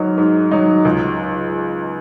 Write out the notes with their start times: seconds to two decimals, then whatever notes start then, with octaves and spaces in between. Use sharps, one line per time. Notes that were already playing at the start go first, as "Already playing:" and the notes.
Already playing: G#2 F#3 D#4 A#4
0.18 G#2
0.51 F#3 D#4
0.85 C#2